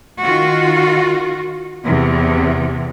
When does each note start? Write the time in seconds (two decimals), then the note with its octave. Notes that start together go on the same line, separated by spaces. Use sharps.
0.21 D#3 F4 F#4
1.85 E2 C3